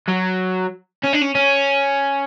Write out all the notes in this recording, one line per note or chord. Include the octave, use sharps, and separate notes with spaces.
F#3
C#4
D4
C#4
C#4